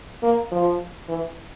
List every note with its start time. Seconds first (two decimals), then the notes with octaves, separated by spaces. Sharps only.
0.23 A#3
0.51 F3
1.09 E3